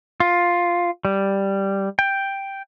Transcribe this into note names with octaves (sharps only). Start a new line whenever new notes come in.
F4
G3
G5